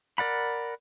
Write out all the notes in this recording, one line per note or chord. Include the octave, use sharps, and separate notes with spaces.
A#4 D5 F#5 B5